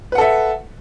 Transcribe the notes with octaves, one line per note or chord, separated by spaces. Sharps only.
A4 B4 E5 F#5